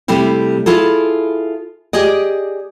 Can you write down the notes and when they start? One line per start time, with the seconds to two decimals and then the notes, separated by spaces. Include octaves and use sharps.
0.08 C3 G3 A3 C4 E4
0.66 E4 F4 G#4 A4
1.93 G4 G#4 D5 D#5